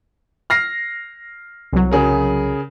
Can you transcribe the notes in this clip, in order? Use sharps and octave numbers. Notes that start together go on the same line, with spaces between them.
F6 A#6 C7
C2 F#3
C#3 G#4 A#4